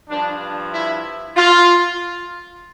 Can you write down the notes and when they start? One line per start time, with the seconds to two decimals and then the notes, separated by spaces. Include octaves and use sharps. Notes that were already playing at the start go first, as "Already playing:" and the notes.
0.10 G2 F3 D4
0.73 E4
1.36 F4